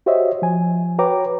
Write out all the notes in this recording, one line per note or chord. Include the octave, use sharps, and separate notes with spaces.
F#4 G4 C5 C#5 D#5 E5
F3 G#5
F#4 B4 C#5 G5 A#5 D6